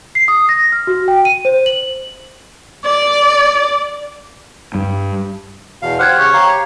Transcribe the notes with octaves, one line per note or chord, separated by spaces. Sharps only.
C7
D#6
A#6
F6
F#4
G5
D#7
C5
F#7
D5
G2
E2 B2 F5
G4 C5 F#5 F6 F#6 G#6
C#3 C#5
G4 F5 A#5